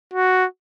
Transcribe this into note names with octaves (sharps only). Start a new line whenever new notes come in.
F#4